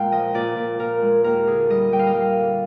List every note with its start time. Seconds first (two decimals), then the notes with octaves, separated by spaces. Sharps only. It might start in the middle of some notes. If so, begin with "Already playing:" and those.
Already playing: A#2 G#3 F5 G5
0.11 F3 D#5
0.34 A#2 D5
0.57 A#2
0.79 A#2 A#4
1.02 G#3
1.24 D#2 A#4
1.47 D3 G#4
1.70 G3 D#5
1.92 G3 G5
1.99 F5
2.07 D#5
2.14 G3 F5
2.38 D3